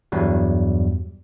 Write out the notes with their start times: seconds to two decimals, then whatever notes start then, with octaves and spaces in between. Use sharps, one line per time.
0.12 E2 G2 F#3 G3